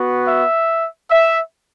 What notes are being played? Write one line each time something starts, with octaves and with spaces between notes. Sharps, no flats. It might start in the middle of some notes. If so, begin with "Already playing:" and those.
Already playing: B3 F#4
E5
E5